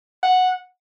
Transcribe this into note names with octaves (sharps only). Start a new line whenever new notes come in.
F#5